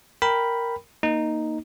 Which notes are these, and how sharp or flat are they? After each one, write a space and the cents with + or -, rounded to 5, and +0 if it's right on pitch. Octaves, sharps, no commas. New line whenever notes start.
A#4 +0 G5 +0 B5 +0
A#3 +0 D#4 +0